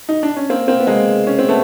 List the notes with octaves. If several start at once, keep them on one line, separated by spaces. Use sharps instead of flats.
D#4
D4
C#4
A#3 C4
A#3 C4
B3
G#3 A#3
C#4
C4
A3 B3